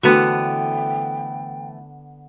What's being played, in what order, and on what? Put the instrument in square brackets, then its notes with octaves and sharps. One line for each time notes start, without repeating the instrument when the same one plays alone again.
[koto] D3 B3 [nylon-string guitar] E3 A3 C5 [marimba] F#4 [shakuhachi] G5